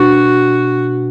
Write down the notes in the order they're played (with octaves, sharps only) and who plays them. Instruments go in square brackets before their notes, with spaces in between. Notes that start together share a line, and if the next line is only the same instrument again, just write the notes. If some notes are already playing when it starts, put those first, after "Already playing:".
Already playing: [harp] B2 G3 D4 [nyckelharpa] F#4